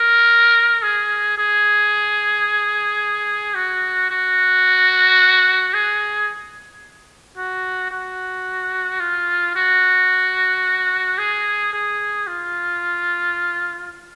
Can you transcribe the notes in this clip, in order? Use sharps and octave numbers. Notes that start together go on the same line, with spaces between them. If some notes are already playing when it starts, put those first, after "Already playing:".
Already playing: A#4
G#4
G#4
F#4
F#4
G#4
F#4
F#4
F4
F#4
G#4
G#4
F4